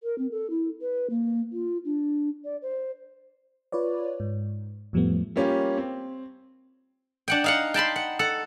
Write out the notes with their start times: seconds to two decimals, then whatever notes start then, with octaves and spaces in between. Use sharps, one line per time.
0.03 A#4
0.18 C4
0.31 A4
0.50 E4
0.81 B4
1.10 A#3
1.53 F4
1.85 D4
2.45 D5
2.62 C5
3.72 F4 B4 C#5 D5
4.20 G#2
4.93 F2 A2 F3 G3 A3 B3
5.36 G3 A#3 C#4 F4 G4
5.78 C4
7.28 D4 F#5 G5
7.44 D#4 F5 F#5
7.74 G5 A5 B5 C6
7.96 F#5
8.19 A4 F#5